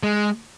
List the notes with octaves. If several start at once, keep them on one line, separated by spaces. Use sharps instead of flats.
G#3